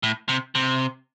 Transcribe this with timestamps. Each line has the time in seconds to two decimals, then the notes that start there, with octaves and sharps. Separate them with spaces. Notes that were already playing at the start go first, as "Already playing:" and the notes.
0.03 A2
0.29 C3
0.55 C3